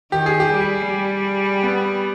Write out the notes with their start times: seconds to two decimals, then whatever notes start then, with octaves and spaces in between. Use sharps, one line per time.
0.12 D#3 G4
0.26 G#4
0.40 G4
0.50 G3
0.88 G3
1.63 B3